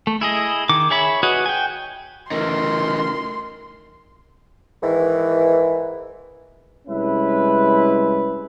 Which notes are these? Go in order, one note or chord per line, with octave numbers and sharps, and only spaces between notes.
A3
E4 G#4 D#5
D#3 D6
G#4 C#5 E5 B5
F#4 G#4 B4 C#5 D#5
G5 G#5
C#3 E3 A3 D#4 A#4 C6
G#2 D#3 E3
C3 G3 G#3 C#4 E4 B4